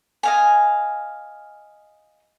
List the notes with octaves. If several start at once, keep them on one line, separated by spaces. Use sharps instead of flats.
D#5 F5 G#5